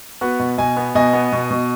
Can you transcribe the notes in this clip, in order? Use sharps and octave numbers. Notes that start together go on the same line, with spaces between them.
B3 F#4 B4
B2
B2 D#5 G#5
B3
B2 D#5 G#5
B3
B2
B2